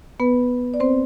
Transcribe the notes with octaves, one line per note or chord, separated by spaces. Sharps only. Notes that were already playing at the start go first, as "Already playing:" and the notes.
B3 B4
D5
C4 C5